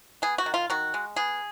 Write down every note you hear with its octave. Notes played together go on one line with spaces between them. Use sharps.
B3 G#4
F#4
D#3
F4
D#3 F#4
G#3
B3 G#4